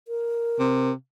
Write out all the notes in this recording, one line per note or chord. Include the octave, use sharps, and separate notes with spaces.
A#4
C3